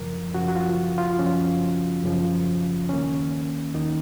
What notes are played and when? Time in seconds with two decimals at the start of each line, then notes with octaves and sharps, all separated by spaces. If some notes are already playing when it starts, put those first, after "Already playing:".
Already playing: F#2 C#3 F3 A#4
0.34 F#2 C#3 F3 F#4
0.48 F#4
0.56 F4
0.98 F4
1.19 F#2 C#3 F3 C#4
2.04 F#2 C#3 F3
2.89 D#2 D#3 A#3 C#4
3.74 D#2 D#3 A#3 D#4